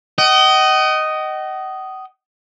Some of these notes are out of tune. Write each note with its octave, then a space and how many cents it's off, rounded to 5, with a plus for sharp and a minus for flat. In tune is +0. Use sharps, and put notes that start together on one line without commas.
D#5 +0 F#5 +45